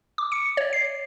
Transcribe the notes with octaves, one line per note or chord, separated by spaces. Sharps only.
D6
C#7
C#5
C7